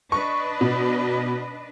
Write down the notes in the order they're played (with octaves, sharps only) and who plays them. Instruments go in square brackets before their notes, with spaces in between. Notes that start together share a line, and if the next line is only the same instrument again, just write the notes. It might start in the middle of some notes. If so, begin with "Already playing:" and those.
[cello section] D4 B4 D#5 [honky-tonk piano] C#6
[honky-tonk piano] B2